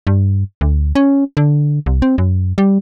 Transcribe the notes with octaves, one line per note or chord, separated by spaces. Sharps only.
G2
D2
C#4
D3
C2
C4
F#2
G3